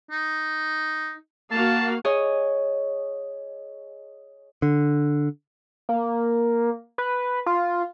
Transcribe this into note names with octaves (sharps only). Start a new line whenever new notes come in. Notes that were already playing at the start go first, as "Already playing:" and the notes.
D#4
A#3 F#4 F5 A5
G#4 C#5 D#5
D3
A#3
B4
F4